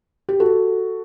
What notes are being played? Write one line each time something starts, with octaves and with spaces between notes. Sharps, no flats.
G4
F#4 A4